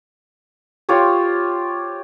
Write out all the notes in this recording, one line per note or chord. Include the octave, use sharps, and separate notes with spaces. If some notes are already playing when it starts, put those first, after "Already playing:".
F4 G4 C5 C#5